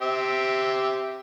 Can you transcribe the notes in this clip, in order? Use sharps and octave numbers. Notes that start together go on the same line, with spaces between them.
C4 G4 E5